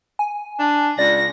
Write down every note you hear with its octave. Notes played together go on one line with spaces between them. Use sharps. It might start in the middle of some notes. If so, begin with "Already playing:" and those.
G#5
D4
C#2 D5 A#6